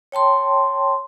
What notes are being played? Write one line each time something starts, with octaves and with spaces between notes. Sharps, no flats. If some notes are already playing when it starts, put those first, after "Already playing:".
C#5 G5 A5 C6